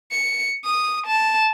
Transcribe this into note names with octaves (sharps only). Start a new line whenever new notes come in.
C#7
D#6
A5